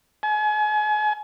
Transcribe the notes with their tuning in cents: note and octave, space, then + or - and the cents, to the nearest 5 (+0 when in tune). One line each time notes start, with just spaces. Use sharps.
G#5 +35